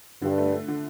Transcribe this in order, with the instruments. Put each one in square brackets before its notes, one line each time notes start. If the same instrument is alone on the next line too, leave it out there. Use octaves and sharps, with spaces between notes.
[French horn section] G2 [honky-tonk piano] D3
[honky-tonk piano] A3
A3
D3